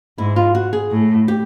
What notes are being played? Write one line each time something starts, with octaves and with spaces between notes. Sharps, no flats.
G#2 E4
F4
F#4
G#4
A2
G4